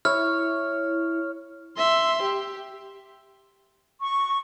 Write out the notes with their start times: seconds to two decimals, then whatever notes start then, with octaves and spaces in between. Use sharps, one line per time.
0.05 E4 C#5 F6
1.77 E5 C6
2.22 G4
4.00 C#6